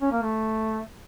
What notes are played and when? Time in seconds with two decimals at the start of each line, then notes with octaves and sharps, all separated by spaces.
0.02 C#4
0.12 A#3
0.22 A3